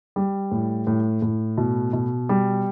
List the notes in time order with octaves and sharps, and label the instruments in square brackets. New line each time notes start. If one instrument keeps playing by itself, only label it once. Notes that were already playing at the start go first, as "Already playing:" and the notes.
[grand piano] G3
A2
A2
A2
B2
B2
G3